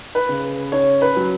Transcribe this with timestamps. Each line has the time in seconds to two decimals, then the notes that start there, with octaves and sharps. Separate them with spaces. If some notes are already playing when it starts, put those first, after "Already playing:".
0.15 B4
0.29 C#3
0.72 C#4 C#5
1.02 B4
1.16 F#3